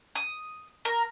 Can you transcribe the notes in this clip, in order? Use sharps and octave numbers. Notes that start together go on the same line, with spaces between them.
D#6
A#4